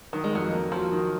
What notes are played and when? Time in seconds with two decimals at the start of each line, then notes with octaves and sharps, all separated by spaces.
0.13 D#3 F#3
0.24 G#3
0.33 F2 F#3
0.52 A#3
0.72 F3 F#3
0.92 D#3